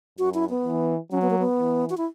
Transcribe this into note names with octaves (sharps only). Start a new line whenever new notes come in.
F#2 F#4
E4
B3
E3
F#3 C#4
B3
A#3
B3
E3
F#4
E4